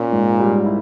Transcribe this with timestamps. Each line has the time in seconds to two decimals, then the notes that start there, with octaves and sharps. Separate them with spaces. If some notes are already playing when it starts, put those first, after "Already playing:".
Already playing: A#2 C#4
0.12 G#2
0.40 G3
0.66 E4